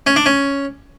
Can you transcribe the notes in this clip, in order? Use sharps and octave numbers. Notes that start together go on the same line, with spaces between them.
C#4
D4
C#4